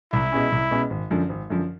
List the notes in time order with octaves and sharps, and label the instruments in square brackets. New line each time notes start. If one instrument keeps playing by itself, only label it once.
[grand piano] C2 [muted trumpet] E4
[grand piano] B2 G#3 C#4
C2
B2 G#3 C#4
G#1
F#2 D3 F3
G#1
F#2 D3 F3